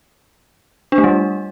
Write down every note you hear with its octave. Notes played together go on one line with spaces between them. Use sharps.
D4
A3
G3